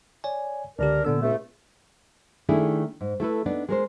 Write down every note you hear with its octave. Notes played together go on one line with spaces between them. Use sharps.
C#5 D5 G#5
C#2 D3 D4 G4 A#4
A#2 D3 B3 E6
C#2 A3
D#3 A3 D4 E4 G#4
G#2
A3 E4 A4 B4
B3 D4 D#4 D5
G#3 A#4 C5